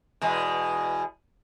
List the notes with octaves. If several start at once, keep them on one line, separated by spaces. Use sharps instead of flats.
E2 B2 G#3